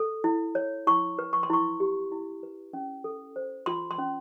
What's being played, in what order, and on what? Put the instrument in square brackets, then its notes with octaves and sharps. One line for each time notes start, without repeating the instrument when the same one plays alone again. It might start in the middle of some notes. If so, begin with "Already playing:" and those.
Already playing: [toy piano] A4
E4
C#5
E4 C#6
B4
C#6
C6
E4 C#6
G4
E4
B4
C#4
A4
C5
F4 C6
C6
C#4